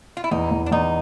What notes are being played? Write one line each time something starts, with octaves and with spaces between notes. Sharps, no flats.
F4
E4
E2 D#4
E2
D4
E2 D#4